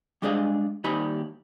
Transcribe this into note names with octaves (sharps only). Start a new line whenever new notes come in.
G3 G#3 D4 G#4 D#5 F5
D#2 G3 D#4 G#5 B5